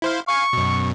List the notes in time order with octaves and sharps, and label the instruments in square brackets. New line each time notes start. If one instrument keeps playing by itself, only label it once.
[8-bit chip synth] E4 C5 F5
[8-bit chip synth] F5 G#5 [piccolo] C#6
[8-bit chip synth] F#2 B2